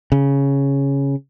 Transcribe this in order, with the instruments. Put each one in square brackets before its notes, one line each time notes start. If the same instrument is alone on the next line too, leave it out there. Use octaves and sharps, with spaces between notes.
[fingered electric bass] C#3